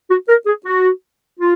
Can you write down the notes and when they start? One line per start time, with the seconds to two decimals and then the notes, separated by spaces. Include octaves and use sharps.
0.10 F#4
0.29 A#4
0.47 G#4
0.66 F#4
1.40 F4